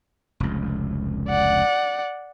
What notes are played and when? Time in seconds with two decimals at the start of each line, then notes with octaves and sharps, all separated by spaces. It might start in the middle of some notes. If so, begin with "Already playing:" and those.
0.40 F1 C#2
1.28 D5 F#5